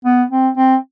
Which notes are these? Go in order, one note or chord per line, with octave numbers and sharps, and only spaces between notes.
B3
C4
C4